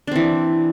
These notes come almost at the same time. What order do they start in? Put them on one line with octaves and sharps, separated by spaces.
D4 C4 E3